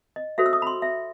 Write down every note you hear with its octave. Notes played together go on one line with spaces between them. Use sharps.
D#5
F#4 A4 C5 E5
E6
D#6
B5
C6
E5